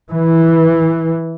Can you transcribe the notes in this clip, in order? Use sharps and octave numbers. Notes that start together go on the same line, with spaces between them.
E3